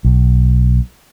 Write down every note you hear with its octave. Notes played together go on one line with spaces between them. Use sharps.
B1